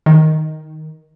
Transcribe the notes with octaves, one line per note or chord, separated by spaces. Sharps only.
D#3